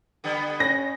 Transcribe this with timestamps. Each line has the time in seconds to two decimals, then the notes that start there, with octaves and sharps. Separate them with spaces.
0.24 D3 G3 B3
0.60 C#4 A#6